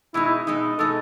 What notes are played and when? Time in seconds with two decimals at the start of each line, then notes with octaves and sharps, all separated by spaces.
0.14 B2 G#3 D#4 E4
0.25 E4
0.47 B2 G#3 D#4
0.78 B2 G#3 D#4 A4